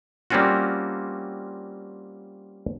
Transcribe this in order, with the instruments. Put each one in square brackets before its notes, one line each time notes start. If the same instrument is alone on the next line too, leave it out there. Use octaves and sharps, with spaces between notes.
[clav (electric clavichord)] G3 A#3 C4 C#4 F4 F#4